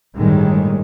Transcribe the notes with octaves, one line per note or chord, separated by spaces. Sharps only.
G1 A2 D#3 G3 G#3